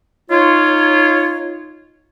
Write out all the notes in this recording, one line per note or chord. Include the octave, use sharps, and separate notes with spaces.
D#4 F4 C#5